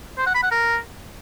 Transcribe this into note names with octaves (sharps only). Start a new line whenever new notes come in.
C5
F#5
B5
F#5
A#4